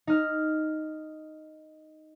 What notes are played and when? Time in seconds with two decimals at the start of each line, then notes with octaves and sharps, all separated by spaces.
0.07 D#4 F6